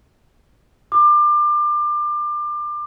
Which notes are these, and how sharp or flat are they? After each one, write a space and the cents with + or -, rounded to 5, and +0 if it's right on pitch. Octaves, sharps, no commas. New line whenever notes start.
D6 +25